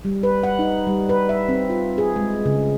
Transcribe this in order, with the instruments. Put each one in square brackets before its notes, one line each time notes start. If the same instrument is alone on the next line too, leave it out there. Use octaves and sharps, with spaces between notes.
[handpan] G3
B4
F#5
D#4
G3
B4
E5
C4
F4
G#4
G#3
C#3